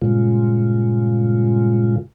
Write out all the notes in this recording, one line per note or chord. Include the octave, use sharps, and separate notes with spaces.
G2 A#2 C#3 G#3 F4